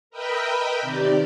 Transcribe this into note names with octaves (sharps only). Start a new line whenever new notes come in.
A#4 B4 D#5 E5 G5 B5
C3 D#3 G4 D5